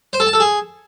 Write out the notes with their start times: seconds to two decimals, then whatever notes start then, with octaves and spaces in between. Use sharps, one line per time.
0.13 C5
0.20 A4
0.27 A5
0.33 A4
0.40 G#4